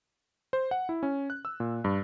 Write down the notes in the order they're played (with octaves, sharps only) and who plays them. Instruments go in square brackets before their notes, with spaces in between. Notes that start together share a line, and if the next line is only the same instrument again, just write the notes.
[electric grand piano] C5
F#5
E4
C#4
F#6
E6
A#2
G2